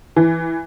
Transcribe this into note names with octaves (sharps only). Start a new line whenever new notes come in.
E3